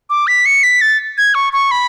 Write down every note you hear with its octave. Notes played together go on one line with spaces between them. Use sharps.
D6
B6
C#7
B6
A6
G#6
C#6
C#6
B5